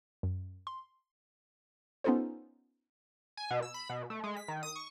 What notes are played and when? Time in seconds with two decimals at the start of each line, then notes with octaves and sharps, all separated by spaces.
0.23 F#2
0.67 C6
2.04 B3 C#4 D#4 F4 A4 C5
3.37 G#5
3.51 B2
3.62 E6
3.74 B5
3.89 B2
4.10 A3
4.24 G#3
4.37 B6
4.48 D#3
4.63 D#6
4.76 C#6